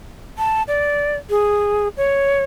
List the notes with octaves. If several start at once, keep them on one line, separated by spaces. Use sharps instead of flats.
A5
D5
G#4
C#5